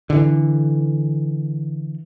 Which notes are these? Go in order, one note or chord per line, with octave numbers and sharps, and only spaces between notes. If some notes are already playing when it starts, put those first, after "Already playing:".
D3 E3